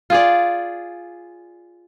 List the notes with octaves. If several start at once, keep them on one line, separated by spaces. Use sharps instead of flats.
F4 G#4 D5